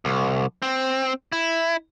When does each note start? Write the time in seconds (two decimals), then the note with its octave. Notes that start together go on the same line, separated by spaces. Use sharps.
0.05 C2
0.62 C4
1.32 E4